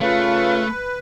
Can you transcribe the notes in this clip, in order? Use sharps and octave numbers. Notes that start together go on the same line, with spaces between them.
C#3 A3 F4 B4